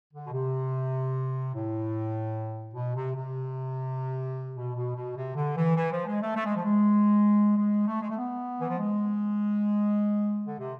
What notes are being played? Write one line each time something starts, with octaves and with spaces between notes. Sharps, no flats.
D3
B2
C3
A2
B2
C3
C3
B2
B2
B2
C3
D3
E3
E3
F3
G#3
A3
A3
G#3
F3
G#3
G#3
A3
G#3
A3
B3
E3
F3
G#3
D3
C3